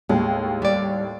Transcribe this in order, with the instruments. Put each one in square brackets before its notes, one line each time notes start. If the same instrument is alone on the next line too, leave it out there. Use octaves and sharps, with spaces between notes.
[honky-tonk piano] D#2 A2 [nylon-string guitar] G#3
[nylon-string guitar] G3 D5